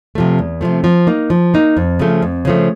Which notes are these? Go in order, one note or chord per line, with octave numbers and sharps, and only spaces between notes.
C3 F3 A3
E2
C3 F3 A3
F3
A#3 D#4
F3
A#3 D#4
F2
C#3 F3 A3
F2
C#3 F3 A3